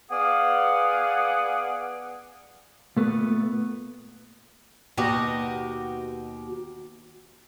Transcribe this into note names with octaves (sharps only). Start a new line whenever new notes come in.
B3 G#4 D5 F5 F#5
A#2 A3 B3
D#2 B2 F#4 G4 D#5